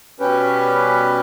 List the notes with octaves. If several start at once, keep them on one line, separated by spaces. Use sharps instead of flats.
B2 G3 C#4 G4 B4